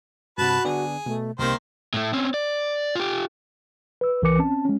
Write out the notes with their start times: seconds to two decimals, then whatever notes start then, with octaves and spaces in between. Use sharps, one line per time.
0.38 G2 C3 F#4 B4 A5
0.65 D3 B3 D4 G#4
1.06 B2 A3
1.39 C2 C3 D#3 A#3 C5
1.94 A2 A3
2.13 C4 C#4
2.34 D5
2.95 F4 G4
4.01 B4 E6
4.22 C2 E3 A#4 B4 D6 C#7
4.39 C4 C#4 A5
4.65 G#3 C#4